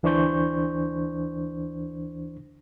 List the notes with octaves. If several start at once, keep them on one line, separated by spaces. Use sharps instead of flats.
D2 E3 D4 C5 C#6 G6